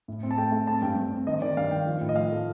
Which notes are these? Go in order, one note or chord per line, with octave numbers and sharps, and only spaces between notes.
A2
C4
A5
A3 G5
A3
C4 A5
G2 G5
G2
C4
D#3 D#5
D#3 D5
G2 F5
D#3 G5
F3
A2
D#5
F3 F5
A3